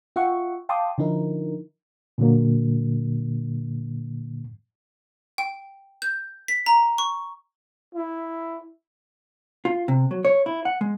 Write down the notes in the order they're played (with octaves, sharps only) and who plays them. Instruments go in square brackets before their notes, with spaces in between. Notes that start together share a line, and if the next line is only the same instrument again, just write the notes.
[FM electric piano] F4 E5 F#5 G5 C#6
F5 G5 A5 C6 D6 D#6
D3 F3 D#4 E4 A#4
[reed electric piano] A#2 D3 F#3 A#3
[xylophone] G5
G6
B6
A#5
C#6
[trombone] E4
[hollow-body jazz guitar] F4
C3
F#3
C#5
E4
F#5
G#3